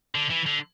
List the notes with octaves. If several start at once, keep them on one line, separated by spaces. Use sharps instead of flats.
D3
E3
D3